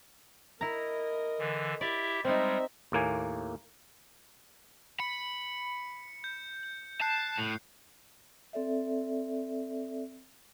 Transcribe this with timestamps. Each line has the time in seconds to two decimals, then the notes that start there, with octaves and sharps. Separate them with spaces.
0.61 E4 A#4 D#5 A#5
1.39 D3 E3
1.81 E4 G4 D5 E5
2.25 G3 G#3 C4 D#4 E5
2.92 D#2 A2 A#3 G#5
5.00 B5 C#7
6.24 G6
7.01 A5 F#6 C7
7.39 A2
8.53 C4 A4 D5 E5